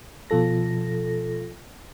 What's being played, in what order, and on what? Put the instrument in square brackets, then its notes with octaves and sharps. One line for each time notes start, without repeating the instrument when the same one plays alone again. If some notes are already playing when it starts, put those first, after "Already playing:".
[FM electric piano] B2 F3 F4 A4 A#6